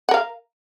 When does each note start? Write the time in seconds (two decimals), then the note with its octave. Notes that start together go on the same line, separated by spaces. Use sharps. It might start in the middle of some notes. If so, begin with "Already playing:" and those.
0.09 F#5
0.11 A#4
0.14 F5